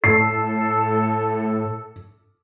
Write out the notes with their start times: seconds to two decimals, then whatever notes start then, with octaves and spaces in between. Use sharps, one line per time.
0.04 A2 A4 C7